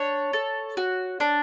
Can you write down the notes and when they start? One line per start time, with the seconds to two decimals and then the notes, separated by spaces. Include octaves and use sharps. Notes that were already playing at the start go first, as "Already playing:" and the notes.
Already playing: D4 C#5
0.33 A4
0.77 F#4
1.20 D4